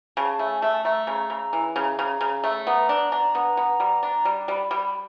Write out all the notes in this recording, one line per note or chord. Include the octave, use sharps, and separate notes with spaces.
C#3 A5
A5
A3 G#5
A3 A5
A3 A#5
C#3
C#3
E3
C#3
C#3
C#3
A3
B3 A#5
D4
D4
B3
B3
G3
D4
G3
G3 B5
G3
B5